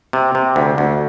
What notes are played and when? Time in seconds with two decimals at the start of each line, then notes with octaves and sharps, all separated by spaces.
0.13 C3
0.35 C3
0.56 D2
0.78 D2